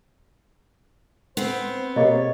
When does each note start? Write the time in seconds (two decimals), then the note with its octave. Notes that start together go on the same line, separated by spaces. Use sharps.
1.37 B3 C4 C5
1.96 B2 A#3 G4 G#4 C#5 D#5